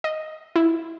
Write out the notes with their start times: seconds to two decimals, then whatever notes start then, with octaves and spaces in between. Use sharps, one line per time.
0.04 D#5
0.56 E4